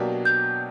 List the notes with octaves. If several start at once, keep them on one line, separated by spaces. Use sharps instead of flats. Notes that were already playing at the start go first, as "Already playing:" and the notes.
Already playing: B2 F#3 A#3 D4 G4
G6